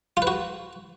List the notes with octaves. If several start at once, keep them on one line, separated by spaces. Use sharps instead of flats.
F4
B4
F#4